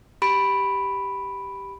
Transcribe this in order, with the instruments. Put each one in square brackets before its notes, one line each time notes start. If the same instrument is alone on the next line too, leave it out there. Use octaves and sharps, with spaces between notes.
[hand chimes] G4 B5 D7